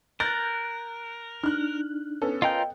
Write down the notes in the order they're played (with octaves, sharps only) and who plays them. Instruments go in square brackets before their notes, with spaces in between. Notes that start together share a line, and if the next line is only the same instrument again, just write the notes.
[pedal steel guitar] A#4 [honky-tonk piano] F#6 G6 A6
[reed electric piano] D4 D#4 [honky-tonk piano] F6 F#6
[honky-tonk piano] B3 C#4 A4
[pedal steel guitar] F4 A#4 G6 [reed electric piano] D#5 G5